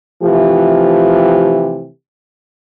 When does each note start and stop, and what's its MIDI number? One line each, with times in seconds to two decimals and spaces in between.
0.23 1.88 48
0.23 1.88 52
0.23 1.88 53
0.23 1.88 57
0.23 1.88 67